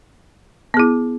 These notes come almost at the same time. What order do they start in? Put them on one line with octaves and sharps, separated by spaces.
B3 G#4 E4